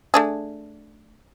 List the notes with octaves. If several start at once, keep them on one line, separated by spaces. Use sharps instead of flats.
A3 D4 G#4